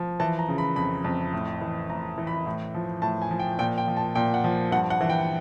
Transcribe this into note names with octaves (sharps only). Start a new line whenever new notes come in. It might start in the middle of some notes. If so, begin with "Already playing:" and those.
Already playing: F3
E3 A5
A#5
C#3
B5
F2 B5
F2
A2
E3
A2 A#5
E3
B5
A2
F3
A2 A5
G#5
F3
G5
A#2 G5
G5
F3
A5
A#2 G5
F#5
F3
G2 F#5
F#5
E3
G5